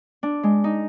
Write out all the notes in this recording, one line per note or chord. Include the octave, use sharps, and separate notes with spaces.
D4
G#3
D#4